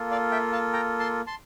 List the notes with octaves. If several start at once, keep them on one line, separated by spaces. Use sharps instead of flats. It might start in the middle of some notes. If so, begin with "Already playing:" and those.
Already playing: A#3 F4 A4
D5 F5
E5 G5
F5 A5
G5 A#5
A5 C6
A5 C6